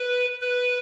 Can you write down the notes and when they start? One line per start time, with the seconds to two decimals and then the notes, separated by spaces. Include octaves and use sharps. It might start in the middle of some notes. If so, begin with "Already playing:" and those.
Already playing: B4
0.41 B4